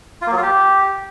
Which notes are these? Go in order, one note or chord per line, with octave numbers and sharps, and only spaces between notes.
F4
A#3
F#3
F4
G4